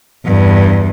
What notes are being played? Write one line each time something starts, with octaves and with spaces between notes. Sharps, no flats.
E2 G2